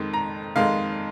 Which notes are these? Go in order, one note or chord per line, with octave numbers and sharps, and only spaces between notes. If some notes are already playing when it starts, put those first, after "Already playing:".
Already playing: F2 D#3 G#3
A#5
F2 D#3 G#3 F5